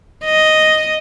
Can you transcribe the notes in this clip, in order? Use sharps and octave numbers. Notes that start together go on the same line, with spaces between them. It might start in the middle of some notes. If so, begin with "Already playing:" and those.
D#5